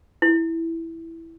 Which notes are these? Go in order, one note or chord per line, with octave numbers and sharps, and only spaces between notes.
E4